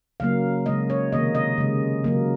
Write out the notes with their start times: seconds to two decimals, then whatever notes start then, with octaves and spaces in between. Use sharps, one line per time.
0.20 C#3 F#3 A#3 F5
0.66 C#3 G#3 D#5
0.90 C#5
1.12 C3 D#3 A#3 D#5
1.35 D#5
1.58 C#3 G#3
2.04 C#3 F#3 A#3